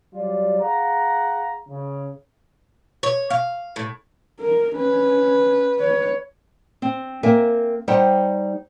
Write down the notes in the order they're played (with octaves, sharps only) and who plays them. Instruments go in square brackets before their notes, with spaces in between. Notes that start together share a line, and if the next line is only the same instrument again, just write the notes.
[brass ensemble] F#3 G3 F4 D5
G#4 F5 F#5 A#5
C#3
[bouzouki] C#5
F5
A2
[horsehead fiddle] A#4
[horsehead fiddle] C#4 [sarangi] B4
[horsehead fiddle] C#5
[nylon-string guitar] C4
A#3 C4 A#4 E5 G#5
G3 D#4 C5 F#5 G5